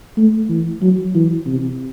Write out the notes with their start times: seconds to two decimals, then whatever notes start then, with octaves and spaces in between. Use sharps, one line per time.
0.17 A3
0.50 E3
0.82 F#3
1.15 E3
1.47 C3